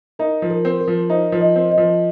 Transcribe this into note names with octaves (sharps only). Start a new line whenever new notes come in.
D#4 A#4
F3
A#4
C4
A#4
F3
D#4 C5
F3
D#5
C4
D#5
F3